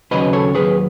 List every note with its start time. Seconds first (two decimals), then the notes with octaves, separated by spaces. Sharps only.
0.11 D#2 C#3 F#3 B4 D#5
0.33 A4 C#5
0.55 D#2 C#3 F#3 G#4 B4